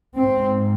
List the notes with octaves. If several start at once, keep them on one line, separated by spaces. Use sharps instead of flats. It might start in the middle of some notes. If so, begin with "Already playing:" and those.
G#2 C4